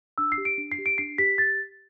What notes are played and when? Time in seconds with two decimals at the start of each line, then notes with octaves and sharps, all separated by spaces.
0.18 D4 E6
0.32 C7
0.38 G4
0.45 D7
0.58 D4
0.72 C7
0.78 G4
0.86 D7
0.98 D4 C7
1.18 G4 B6
1.38 G4 A6